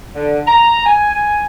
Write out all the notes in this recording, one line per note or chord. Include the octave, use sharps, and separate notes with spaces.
D3
A#5
G#5